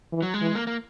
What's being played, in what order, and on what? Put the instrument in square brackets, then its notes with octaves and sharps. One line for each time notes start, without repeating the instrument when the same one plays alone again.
[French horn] E3
[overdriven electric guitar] F#3
G#3
[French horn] E3
[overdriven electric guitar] A#3
A#3